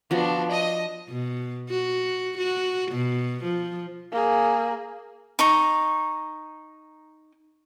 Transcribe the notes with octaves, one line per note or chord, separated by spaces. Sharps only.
F3 B3 D4 F#4
D#5
B2
F#4
F#4
B2
F3
A#3 G#4
D#4 A#5 C#6